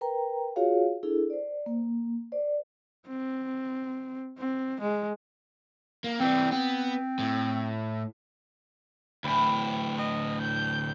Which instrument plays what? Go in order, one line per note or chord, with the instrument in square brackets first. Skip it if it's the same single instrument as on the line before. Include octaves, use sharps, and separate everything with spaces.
[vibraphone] A#4 B4 G5 A#5
F4 F#4 G#4 C#5 F5
D4 E4 G#4 A4
C5 D5
A#3
C5 D5
[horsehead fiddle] C4
C4
G#3
[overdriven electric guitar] A#3
[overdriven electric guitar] E3 G3 [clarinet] C4
[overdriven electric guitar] B3 [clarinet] C4
[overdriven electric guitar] A2
[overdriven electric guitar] D2 A2 [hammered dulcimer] E3 G5 B5
[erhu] D#5
G6